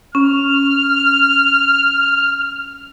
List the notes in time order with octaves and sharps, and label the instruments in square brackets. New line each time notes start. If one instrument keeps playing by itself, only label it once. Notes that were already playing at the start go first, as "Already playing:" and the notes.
[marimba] C#4 [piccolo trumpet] F6